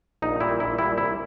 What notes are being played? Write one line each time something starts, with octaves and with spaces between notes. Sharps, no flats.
A#1 D#4
A#2 G3 E4
A#1 E4
A#2 G3 E4
C2 E4